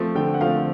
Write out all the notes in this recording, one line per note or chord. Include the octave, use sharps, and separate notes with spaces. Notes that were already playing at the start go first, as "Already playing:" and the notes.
Already playing: F3 A3 C4
D3 G5
F#5
F3 A3 C4 F5